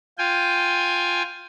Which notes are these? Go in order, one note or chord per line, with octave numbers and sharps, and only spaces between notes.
F4 G5 G#5